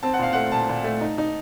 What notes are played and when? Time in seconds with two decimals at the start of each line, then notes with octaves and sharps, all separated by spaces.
0.03 C4 A5
0.14 F#5
0.19 A#2 F5
0.33 A3 F#5
0.52 A#2 A5
0.69 A#2
0.84 A3
1.01 D#4
1.18 D#4